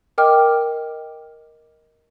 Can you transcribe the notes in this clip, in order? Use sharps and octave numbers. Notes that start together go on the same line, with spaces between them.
A#4 D#5 G5 D6 F6